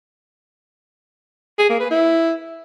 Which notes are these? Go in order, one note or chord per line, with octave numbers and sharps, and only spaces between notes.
G#4
A#3
B4
E4